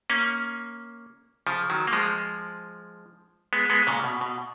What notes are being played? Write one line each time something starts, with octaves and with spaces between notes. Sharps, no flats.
A#3 C#4
C#3 F3
D#3 F#3
A#3
F3 G#3
G#3 B3
G#3 B3
A#2 C#3
B2
B2